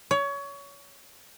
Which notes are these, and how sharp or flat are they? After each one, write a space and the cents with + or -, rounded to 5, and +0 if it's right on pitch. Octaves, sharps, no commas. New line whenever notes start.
C#5 +25